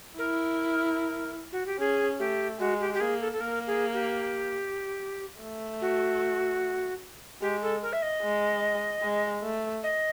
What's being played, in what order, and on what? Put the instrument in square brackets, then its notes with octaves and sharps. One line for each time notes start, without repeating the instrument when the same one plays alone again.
[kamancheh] E4 [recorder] A#4
[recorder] F#4
G4
[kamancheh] C#4 [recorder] G#4
[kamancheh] A3 [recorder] G4
[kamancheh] G#3 [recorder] F#4
[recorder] G4
G4
[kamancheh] A#3 [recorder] G#4
[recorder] A4
A4
[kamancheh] A#3 [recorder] A#4
[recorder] G#4
G4
[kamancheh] A3
[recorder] F#4
[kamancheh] G#3 [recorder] G4
[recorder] A4
A#4
E5
D#5
[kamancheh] G#3
G#3
A3
[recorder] D#5